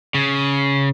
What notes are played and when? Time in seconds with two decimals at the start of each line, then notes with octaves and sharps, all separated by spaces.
0.15 C#3